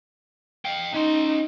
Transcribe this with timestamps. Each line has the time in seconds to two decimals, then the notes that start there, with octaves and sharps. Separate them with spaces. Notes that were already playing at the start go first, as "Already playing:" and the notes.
0.65 F5 G5
0.94 C#4 D#4 C6